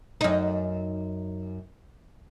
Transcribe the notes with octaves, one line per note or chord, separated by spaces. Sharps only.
F#2 D#4